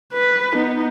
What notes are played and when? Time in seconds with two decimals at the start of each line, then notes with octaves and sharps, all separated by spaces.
0.13 B4
0.53 B3 D#4